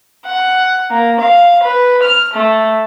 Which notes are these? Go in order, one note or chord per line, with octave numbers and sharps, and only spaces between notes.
F#5
A#3
F5
B4
F6
A3